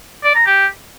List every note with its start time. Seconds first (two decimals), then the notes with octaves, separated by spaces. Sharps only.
0.24 D5
0.35 A#5
0.46 G4